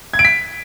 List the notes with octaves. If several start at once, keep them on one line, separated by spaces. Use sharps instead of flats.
G#6
D7
B6